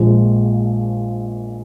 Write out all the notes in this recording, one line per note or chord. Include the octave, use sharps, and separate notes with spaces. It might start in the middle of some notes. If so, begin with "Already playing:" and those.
Already playing: A#1 A#2 F3 G#3